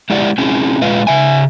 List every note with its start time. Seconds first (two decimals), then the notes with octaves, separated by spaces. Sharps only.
0.10 G#3 E4 G4 D5 F#5
0.38 C4 C#4 E4 G#4
0.81 A#2 G#3 F4 B4 D#5 F5
1.07 C#3 E5 G#5